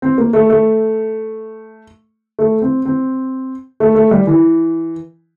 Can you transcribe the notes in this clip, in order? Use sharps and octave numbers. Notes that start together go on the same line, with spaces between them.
C4
A#3
A3
A3
A3
C4
C4
A3
A3
G3
E3